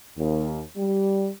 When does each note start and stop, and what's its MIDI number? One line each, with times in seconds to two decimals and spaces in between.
0.17 0.61 39
0.77 1.29 55